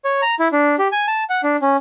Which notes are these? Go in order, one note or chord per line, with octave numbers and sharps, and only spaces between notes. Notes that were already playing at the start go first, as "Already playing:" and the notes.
C#5
A#5
E4
D4
G4
G#5
A5
F#5
D4
C#4